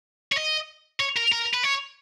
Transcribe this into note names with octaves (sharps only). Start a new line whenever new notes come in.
C#5
D#5
C#5
A#4
A#4
B4
C#5